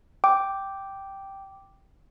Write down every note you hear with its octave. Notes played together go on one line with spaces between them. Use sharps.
G5 D6